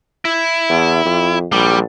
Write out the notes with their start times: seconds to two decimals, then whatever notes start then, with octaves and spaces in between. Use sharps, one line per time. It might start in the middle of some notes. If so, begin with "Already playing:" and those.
0.25 E4
0.69 E2
1.05 F2
1.52 A#1 G3